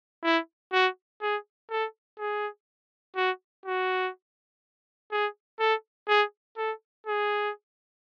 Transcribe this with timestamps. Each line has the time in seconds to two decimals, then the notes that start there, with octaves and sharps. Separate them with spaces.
0.24 E4
0.73 F#4
1.22 G#4
1.70 A4
2.19 G#4
3.16 F#4
3.66 F#4
5.12 G#4
5.60 A4
6.08 G#4
6.57 A4
7.07 G#4